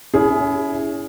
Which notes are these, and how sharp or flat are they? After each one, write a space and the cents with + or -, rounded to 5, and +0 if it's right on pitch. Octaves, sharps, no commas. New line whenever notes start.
C#4 +35 E4 +0 G#4 +0